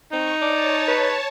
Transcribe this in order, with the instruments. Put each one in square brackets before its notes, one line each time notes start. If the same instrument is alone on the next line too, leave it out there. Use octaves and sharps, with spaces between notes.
[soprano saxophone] C4 [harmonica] D#4 [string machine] C#6
[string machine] C#5 A5 [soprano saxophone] D5
[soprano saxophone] B4